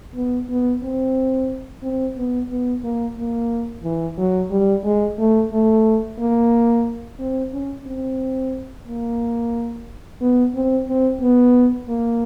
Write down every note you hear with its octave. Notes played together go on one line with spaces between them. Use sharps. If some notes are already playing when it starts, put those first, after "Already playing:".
B3
B3
C4
C4
B3
B3
A#3
A#3
E3
F#3
G3
G#3
A3
A3
A#3
C4
C#4
C4
A#3
B3
C4
C4
B3
A#3